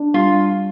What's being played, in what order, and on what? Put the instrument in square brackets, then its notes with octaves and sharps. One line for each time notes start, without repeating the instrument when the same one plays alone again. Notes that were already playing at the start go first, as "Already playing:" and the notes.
Already playing: [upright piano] D4
[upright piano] G3 [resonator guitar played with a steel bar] F4